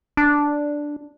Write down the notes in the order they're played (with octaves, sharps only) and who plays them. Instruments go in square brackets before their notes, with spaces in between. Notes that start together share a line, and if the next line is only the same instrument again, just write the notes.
[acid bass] D4